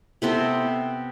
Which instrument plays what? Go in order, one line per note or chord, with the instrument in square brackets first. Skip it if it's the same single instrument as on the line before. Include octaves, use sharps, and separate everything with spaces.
[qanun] C3 B3 C4 A4